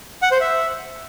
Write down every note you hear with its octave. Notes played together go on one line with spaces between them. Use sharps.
F#5
C5
E5